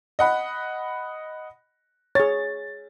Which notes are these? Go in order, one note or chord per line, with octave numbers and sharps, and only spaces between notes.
D#5 F#5 B5
G#4 C#5 A6